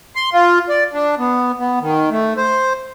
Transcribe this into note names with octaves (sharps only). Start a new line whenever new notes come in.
C6
F4
D5
D4
B3
B3
D#3
A3
C5